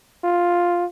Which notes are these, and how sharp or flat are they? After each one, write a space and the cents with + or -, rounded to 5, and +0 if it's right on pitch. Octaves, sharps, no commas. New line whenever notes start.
F4 +5